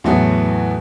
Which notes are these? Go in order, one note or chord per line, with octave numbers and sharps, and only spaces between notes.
E2 A2 F#3 A3 B3